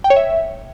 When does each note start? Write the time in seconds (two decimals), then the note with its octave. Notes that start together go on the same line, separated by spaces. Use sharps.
0.04 G5
0.10 C#5
0.16 E5